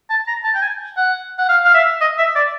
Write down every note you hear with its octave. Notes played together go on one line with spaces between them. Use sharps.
A5
A#5
A5
G5
G#5
F#5
F#5
F5
F5
E5
D#5
E5
D5